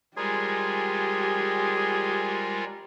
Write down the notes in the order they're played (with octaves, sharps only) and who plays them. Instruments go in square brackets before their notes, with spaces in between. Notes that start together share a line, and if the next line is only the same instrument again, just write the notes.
[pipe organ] G3 G#3 F4 [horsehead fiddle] G4 [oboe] G#4 [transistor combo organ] A#4 C5 G#5